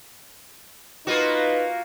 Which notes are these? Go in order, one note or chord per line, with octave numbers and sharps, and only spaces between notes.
A#3 D#4 F4 F#4 B4